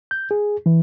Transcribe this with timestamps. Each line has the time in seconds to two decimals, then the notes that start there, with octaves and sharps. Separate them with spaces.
0.11 G6
0.31 G#4
0.66 E3